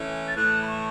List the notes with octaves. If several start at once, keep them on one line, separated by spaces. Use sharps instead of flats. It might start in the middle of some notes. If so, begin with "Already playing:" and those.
Already playing: E3 A3 C#4
A6
A2 E3 A3 F#6
B5
C#6